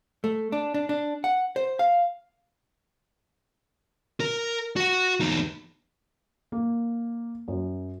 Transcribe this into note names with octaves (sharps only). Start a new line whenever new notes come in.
A3
D4
D4
D4
F#5
C5
F5
A#4
F#4 F#5
E2 D#4
A#3
F#2